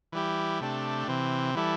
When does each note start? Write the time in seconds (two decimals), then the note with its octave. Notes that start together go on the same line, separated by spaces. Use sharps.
0.12 E3 G3 E4 G4
0.61 C3 A3 D4 G4
1.08 C3 E3 C4
1.55 E3 G3 E4 A4